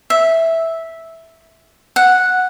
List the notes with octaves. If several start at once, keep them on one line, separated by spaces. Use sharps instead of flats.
E5
F#5